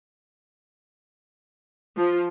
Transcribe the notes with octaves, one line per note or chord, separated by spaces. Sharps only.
F3